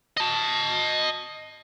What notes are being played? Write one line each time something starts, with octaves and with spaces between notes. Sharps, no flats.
D#5 A5